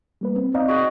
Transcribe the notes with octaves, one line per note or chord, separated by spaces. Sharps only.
G3 A#3 B4
C4
C4 D#4 D5 F5
F#4 G#4